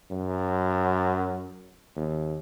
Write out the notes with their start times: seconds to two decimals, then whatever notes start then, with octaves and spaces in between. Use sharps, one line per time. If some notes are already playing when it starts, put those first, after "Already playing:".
0.11 F#2
1.96 D#2